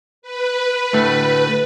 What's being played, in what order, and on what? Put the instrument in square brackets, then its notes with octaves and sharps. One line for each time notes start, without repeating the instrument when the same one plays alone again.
[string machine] B4
[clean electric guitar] D2 A2 A3